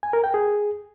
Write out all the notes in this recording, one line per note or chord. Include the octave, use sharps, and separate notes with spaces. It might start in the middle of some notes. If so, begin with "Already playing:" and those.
G#5
A#4
G5
G#4